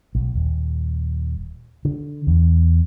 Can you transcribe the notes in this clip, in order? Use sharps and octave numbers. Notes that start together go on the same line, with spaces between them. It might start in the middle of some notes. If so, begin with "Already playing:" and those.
B1
D#1
D3
E2